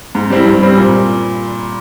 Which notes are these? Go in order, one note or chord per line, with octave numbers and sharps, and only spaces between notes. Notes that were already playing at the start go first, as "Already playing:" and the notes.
G#2
G3 C4 E4
G2
G3 C4
A#2